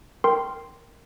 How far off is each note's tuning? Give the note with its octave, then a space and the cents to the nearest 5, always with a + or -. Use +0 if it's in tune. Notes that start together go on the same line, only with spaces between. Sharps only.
A#4 +0 G5 +0 C6 +0